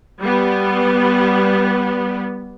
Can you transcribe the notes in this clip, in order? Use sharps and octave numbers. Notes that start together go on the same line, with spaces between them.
G3 B3